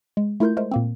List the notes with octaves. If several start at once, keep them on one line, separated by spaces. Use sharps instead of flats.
G#3
A3 E4 F4 A#4 C6 G6
G#3 A3 A#4 C5
A#2 A#3 C4